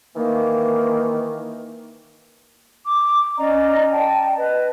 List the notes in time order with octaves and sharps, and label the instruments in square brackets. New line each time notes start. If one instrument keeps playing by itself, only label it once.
[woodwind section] D#3 E3 A#3
[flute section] D6
C#4 D5 D#5 A#5
G5 A5
B4 D#5